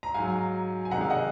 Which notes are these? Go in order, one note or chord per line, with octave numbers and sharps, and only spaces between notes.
A#5
G#2 F#3 F5 G#5
G#5
C3 D#3 G#3 F#5 A#5
F5 G#5
D#5 F#5